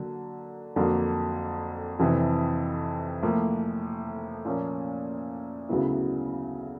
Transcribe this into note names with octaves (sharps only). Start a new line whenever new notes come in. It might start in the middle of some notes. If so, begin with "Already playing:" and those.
Already playing: D3 F#3 A#3
F2 D3 F#3 A#3
F2 C3 E3
A2 F3 A#3
A#2 F3 A#3 C#4
D2 C#3 F#3 B3 E4